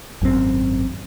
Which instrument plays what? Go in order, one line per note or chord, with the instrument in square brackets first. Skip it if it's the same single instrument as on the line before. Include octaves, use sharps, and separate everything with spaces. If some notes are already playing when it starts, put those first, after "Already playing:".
[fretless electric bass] G#1 F#2 A#2 C4